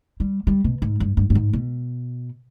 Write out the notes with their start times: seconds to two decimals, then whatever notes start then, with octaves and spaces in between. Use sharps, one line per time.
0.20 G3
0.47 G3
0.64 B2
0.82 G#2
1.00 G2
1.17 G2
1.30 G2
1.35 G#2
1.53 B2